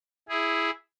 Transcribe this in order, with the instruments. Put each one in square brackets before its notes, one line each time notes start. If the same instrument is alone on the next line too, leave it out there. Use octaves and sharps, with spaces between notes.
[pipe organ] E4 G#4